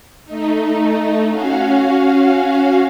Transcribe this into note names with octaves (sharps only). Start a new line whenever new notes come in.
A3 D#4
C#4 F#4 F5